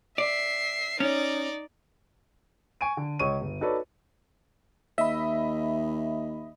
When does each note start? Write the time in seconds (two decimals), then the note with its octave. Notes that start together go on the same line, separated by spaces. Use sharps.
0.18 D5 E5 C7
1.00 C#4 D#4 D5
2.81 G#5 C#6 D7 D#7
2.97 D3
3.19 C#2 C#5 C#6 D#7
3.41 G1
3.61 D#4 F#4 A4 B4 C#5 D5
4.98 D#2 D#5 E5 B5